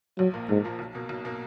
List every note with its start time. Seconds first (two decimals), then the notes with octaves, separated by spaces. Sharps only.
0.19 A#1 F#3
0.33 A#2 F3 A#3
0.49 A#1 G#2
0.64 A#2 F3 A#3
0.79 B1
0.95 B2 A#3
1.09 B1
1.25 B2 A#3